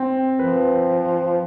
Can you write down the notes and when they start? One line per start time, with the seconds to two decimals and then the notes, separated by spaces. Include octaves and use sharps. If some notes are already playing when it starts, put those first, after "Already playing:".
Already playing: C4
0.39 F3 B4